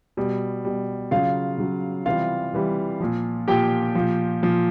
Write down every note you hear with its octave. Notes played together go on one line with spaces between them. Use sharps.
B2 G3
B2 G3
C#3 F#3 F4 F5
C#3 F#3
C3 E3 G3 F4 F5
C3 E3 G3
A#2 F3
A#2 F3 G4 G5
A#2 F3
A#2 F3